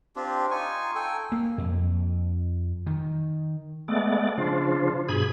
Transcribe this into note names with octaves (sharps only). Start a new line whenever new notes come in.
C4 D4 F4 G4
D#4 F4 G#5 C#6
A4 G5 G#5
A#3
F2
D#3
G#3 A3 B3 D5
C#3 F3 D4 F4
G2 B2 G#4 B5 G#6